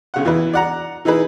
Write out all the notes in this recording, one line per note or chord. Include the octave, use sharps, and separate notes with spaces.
B1 C#3 F#5
E2 E3 E4 B4
D5 F#5 A#5
E3 D#4 E4 G#4 B4